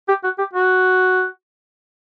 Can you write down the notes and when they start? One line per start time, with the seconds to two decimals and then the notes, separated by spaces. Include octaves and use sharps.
0.08 G4
0.24 F#4
0.38 G4
0.53 F#4